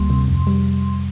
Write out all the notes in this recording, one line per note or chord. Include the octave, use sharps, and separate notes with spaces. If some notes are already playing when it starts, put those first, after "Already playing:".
Already playing: D2 G3 A#3 C6
C3
F2
G3